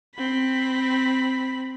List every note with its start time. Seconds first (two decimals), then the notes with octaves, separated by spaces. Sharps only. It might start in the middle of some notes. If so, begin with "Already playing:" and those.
0.15 C4 B5